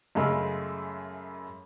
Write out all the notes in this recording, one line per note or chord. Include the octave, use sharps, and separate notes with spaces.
F#2 C#3 G#3 A3